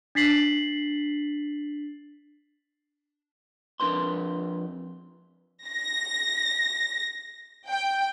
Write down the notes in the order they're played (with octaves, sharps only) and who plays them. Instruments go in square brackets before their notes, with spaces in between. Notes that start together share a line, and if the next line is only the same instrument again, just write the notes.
[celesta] D4 A6 B6 C7 F#7
[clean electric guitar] F2 D4 A#4 B4 C6
[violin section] A#6
G5